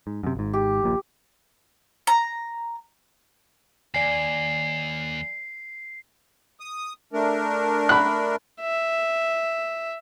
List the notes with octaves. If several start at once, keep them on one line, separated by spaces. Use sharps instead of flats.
G#2
F#2 C3
G#1 G#2
G4
D#1 A#1 A#2
A#5
D#2 D5 G#5 C7
D#6
A3 D4 A#4
B5 F#6
E5